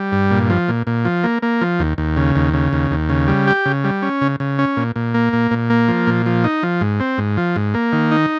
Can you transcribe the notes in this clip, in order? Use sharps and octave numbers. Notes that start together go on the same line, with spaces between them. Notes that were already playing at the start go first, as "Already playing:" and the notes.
Already playing: G3
G2
A#2
F3
A#2
A#2
F3
A#3
A#3
F3
D#2
D#2
C#3
D#2
C#3
D#2
D#2
C#3
G3
G4
C#3
G3
C#4
C#3
C#3
C#4
A#2
A#2
A#3
A#2
A#2
A#3
F3
A#2
F3
D#4
F3
G#2
C4
G#2
F3
G#2
A#3
D#3
D#4